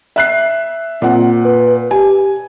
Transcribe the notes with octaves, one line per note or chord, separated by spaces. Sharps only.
E5 F#6 C7
A#2 C4 F#5
B4
G4 G#5